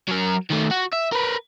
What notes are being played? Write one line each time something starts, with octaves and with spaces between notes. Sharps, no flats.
F#3 A#4
D#3 A3
F#4
E5
A#4 B4